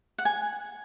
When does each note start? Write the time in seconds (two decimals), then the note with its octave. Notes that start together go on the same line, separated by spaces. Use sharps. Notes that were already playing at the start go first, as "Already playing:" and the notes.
0.18 F#5
0.25 G#5